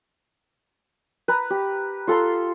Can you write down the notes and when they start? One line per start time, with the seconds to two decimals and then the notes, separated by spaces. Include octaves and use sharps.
1.28 B4 A#5
1.50 G4
2.07 F4 A4 A#5 C6